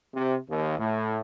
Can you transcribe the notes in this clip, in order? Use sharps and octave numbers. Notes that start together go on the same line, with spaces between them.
C3
D#2
A2